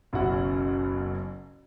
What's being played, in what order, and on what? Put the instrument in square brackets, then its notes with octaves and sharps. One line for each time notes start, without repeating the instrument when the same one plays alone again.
[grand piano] F#1 B1 F#2 E4 F#4 F#5